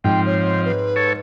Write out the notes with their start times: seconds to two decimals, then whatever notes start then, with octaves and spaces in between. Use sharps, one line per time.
0.04 G#2 F3 C4 G5
0.26 C#5
0.65 B4
0.96 A4 C#5